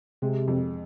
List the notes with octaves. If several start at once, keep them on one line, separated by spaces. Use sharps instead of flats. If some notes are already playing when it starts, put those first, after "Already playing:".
C3 G#3
F2